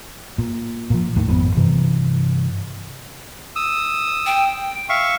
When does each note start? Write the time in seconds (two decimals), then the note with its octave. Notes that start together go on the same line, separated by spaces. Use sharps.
0.38 A#2
0.90 A#2 F3
1.16 D#2 A2 D#3
1.27 G#1 F2 C3 B3
1.57 G2 C3 E3
3.56 D#6 E6
4.26 G5
4.89 E5 F5 C#6